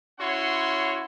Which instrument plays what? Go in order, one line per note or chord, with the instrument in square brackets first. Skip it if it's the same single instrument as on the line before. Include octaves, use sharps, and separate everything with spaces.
[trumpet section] C#4 E4 F#4 C#5 F#5 C6